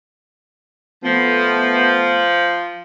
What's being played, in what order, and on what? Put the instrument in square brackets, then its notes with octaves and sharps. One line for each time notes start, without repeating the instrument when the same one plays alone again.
[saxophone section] F3 [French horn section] A3 B3